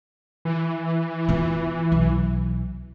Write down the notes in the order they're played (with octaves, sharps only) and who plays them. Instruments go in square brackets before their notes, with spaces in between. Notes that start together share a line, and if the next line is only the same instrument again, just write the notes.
[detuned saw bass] E3
[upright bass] B3 F4
B1